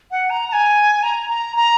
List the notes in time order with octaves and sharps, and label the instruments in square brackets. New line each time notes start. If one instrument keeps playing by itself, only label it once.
[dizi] F#5
A#5
A#5
G#5
A#5
A#5
A#5